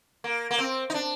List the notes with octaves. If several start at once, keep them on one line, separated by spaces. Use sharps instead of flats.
A#3
A#3
C4
D#4
D4